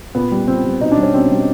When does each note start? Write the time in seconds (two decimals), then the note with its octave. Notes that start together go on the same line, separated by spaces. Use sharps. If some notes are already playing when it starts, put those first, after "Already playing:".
0.15 A#2 B3
0.31 G3
0.48 A#2 C4
0.64 G3
0.81 B2 D#4
0.92 D4
0.97 G3
1.03 C#4
1.14 B2 C4
1.30 G3